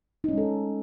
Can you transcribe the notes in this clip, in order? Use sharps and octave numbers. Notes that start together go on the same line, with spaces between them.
G#3 C#4 D#4 A4